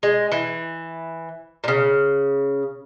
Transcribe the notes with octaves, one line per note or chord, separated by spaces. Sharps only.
G#3
E3
A#2 C#3